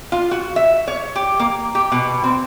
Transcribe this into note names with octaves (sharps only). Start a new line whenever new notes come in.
F4
F#4
E5
C#5
G4
A#3
G4
B2
C4